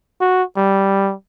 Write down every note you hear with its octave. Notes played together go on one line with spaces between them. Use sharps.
F#4
G3